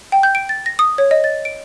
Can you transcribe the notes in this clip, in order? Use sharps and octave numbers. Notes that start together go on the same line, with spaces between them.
G5
G6
D7
A6
A#6
D#6
C#5
D#5
A6
D7